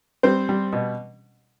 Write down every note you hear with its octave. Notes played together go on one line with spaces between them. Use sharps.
G3 C4 C5
G3
B2